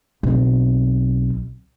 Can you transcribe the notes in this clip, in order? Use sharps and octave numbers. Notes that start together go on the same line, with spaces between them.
B1 C4